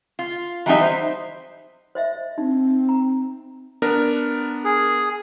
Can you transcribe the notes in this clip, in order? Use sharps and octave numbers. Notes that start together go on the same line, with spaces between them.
F4
E3 F#3 G3 D#4 E5
C5
C5 D#5 E5
C4 D#4
A#5
B3 D4 A#4
G#4